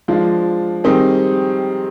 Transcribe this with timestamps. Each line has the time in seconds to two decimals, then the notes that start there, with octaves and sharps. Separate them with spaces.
0.08 F3 G#3 D4 F4
0.84 D#3 G3 C4 D#4 G#4